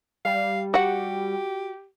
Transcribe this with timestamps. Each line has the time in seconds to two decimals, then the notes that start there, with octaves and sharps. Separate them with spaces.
0.25 G3 F5
0.74 F#4 G4 F#5